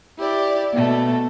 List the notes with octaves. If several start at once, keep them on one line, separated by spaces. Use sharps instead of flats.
E4 G4 D5
B2 A3